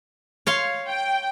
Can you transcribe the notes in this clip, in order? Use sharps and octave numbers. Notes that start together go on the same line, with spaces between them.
C#5 F5 C6
G5